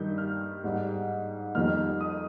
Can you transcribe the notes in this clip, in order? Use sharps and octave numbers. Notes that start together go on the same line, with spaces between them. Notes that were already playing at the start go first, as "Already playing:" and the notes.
Already playing: G2 D#3 G3 G6
F6
G#2 G3
F2 D#3 G3 F6
D#6